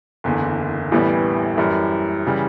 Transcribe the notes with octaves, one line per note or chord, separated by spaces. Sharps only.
F#1 E2 D3
A1 A2 E3 G3 B3
F#2 E3 G3
C#3 E3 G3